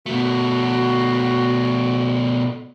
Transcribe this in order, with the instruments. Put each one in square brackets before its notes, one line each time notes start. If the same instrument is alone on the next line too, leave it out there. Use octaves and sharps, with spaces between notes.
[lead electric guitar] B2 A3 [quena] F#4